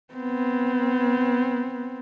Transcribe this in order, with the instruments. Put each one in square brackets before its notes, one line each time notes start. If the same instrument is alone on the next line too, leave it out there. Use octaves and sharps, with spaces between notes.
[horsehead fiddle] B3 C4